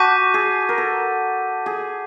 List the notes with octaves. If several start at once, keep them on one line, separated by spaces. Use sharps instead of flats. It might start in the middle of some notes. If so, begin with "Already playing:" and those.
Already playing: F#4 A5 D6 G6 B6 D#7
G#4
A#4
A4
G#4